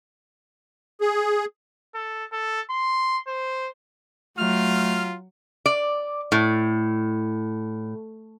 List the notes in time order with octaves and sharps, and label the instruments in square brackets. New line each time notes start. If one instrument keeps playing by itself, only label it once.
[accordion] G#4
[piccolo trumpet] A4
A4
C6
C5
[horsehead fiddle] F#3 [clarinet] A3 [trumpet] F4 [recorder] F6
[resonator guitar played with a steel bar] D5
A2